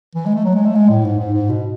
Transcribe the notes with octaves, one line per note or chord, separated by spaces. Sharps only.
E3
G#3
A3
F#3
G#3
A3
G#3
A2
G#2
G#2
G#2
B2